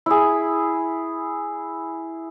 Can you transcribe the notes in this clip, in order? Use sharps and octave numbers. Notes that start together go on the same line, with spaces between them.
E4 G#4